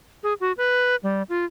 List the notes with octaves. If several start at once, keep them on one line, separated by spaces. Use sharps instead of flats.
G#4
F#4
B4
G3
F4